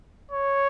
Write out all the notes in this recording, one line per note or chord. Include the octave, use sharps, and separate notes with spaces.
C#5